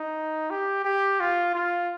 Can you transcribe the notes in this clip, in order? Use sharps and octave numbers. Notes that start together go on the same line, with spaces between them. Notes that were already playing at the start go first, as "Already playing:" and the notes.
Already playing: D#4
G4
G4
F4
F4